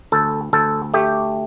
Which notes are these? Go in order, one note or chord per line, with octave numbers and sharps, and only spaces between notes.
D2 A4
D2 A4
A3 G4